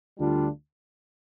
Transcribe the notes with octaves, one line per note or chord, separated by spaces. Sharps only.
D2 D3 G3 D4 F4